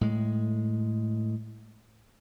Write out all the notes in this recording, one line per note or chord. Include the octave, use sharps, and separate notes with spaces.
A2 G#3